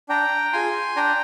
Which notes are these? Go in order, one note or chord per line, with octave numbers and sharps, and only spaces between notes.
D4 G5 A#5
F4 G#4 G#5 C6
D4 G5 A#5